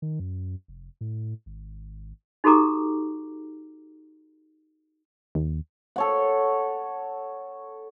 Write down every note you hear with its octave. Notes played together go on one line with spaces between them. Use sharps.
D#3
F#2
F1
A2
G#1
D#4 F#4 G4 A4 A#5 D6
D#2
A4 C#5 F#5